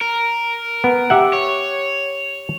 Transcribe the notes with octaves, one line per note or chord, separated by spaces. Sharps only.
A#4
B3
G4 E5 F#5
C#5